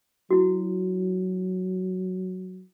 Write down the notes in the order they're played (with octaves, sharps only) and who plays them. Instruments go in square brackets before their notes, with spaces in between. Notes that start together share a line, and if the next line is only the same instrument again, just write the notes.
[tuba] F#3 [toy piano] E4 F#4